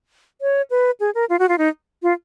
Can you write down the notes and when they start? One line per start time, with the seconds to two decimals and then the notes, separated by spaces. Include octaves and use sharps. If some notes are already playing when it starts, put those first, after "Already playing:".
0.41 C#5
0.70 B4
1.00 G#4
1.15 A#4
1.29 F4
1.39 F#4
1.49 F4
1.58 D#4
2.03 F4